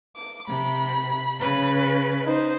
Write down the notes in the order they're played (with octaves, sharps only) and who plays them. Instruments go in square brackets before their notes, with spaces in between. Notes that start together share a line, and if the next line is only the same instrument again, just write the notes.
[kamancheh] D6
[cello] C3 [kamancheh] B5
[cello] C#3 B4
[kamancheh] D#4 C5